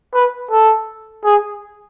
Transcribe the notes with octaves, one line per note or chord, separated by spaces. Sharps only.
B4
A4
G#4